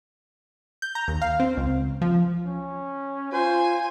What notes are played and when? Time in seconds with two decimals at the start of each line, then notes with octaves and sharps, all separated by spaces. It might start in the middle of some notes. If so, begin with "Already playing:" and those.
0.82 G6
0.95 A#5
1.08 D#2
1.22 F5
1.40 C4
1.57 C#2
2.01 F3
2.46 C#4
3.33 F4 C5 G#5